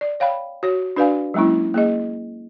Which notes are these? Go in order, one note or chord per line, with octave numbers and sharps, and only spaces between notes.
D5
C#5 F5 G5 B5
F#4 C#5
D4 F#4 B4 D5 F5 G#5
F#3 G#3 A#3 C#4 E4
A#3 G#4 D#5